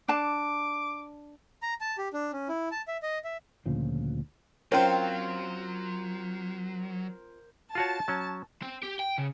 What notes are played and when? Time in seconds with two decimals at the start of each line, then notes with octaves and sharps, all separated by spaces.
0.08 D4 A5 D6
1.62 A#5
1.81 A5
1.98 G4
2.13 D4
2.33 C#4
2.49 E4
2.71 A5
2.88 E5
3.03 D#5
3.24 E5
3.66 D2 A#2 C#3 F3
4.72 F#3 C4 C#4 F4 A#4 C5 C#5
7.75 F4 F#4 C#5 A5
8.08 F#3 C#4
8.62 C4
8.83 G4
9.00 G5
9.18 C#3